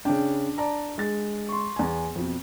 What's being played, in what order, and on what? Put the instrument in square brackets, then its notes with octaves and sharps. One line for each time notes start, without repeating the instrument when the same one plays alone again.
[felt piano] C#3 G5 [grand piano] D4
[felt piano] D5 A5 A#5
G#3 A6
[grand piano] C6 C#6
[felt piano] E2 G#5
F2 B2